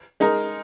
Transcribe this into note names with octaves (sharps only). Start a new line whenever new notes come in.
G#3 D#4 A#4